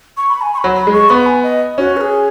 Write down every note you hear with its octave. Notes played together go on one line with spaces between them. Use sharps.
C#6
B5
G#5
C#6
B5
F#3
B5
G#3
C#6
B3 B5
G#5
D#5
C#4 F#4
B4
G#4